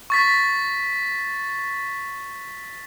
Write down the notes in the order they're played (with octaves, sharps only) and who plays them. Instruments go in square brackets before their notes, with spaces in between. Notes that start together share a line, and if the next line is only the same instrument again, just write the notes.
[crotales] C#6 A6 B6